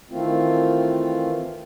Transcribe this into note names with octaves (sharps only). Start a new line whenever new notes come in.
D#3 E3 A3 C4 F4